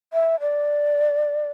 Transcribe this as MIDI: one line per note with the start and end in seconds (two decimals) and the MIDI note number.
0.13 0.39 76
0.40 1.51 74